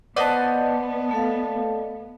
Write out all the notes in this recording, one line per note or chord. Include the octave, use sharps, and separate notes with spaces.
B3 B4 C5 D5 D#5 F#5 A5
A3 A4 F5